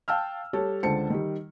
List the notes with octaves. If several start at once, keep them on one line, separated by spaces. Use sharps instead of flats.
F5 G5 A5 E6 F6
G3 G4 A4 C#5
C#2 D3 C5 A5 C#7
D#3 G3